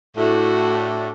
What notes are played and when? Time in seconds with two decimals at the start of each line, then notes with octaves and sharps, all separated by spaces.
0.17 A2 A3 D4 F#4